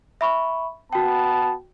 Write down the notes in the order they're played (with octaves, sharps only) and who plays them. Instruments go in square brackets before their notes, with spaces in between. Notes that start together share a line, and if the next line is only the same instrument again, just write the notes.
[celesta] E5 B5 C#6
[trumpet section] B3 A5 [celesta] F#4 G5